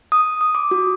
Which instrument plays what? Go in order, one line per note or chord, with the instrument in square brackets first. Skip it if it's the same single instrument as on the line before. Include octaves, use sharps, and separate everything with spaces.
[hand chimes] D#6
D#6
D6
F#4